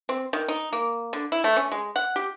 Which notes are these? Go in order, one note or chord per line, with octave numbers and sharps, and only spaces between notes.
C4
D#3
D#4
A#3
D3
E4
A3
C#4
G#3
F#5
G4